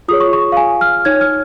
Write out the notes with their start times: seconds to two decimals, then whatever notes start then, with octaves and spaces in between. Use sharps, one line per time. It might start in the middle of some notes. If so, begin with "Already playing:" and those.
0.08 F4 G#4 C#5 D#6
0.20 C#6
0.33 C#6
0.52 F5
0.57 G#5
0.81 F6
1.05 D#4 C#5 G#6
1.21 F6